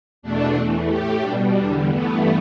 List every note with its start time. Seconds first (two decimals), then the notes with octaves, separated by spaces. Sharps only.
0.22 E2 B2 A3 D4
0.55 E2 E3 A3
0.89 A2 A3 G4
1.21 B2 G3 D4
1.54 E2 D3 G3 D4
1.87 G2 E3 A3 B3